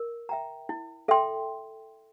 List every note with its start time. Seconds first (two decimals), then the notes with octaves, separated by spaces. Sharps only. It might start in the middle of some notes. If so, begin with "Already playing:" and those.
Already playing: A#4
0.29 E5 G5 A#5
0.69 E4
1.08 A4 E5 G5 C6